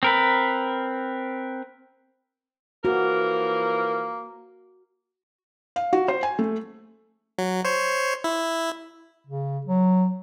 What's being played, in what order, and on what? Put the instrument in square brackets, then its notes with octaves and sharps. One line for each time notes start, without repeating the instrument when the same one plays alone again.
[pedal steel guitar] C4 A#4 B4
[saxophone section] E3 F3 A#4 [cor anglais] A#3 [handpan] F#4
[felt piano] F5
F#4
C5
G#5
A3
[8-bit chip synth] F#3
C5 C#5
E4
[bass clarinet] C#3
F#3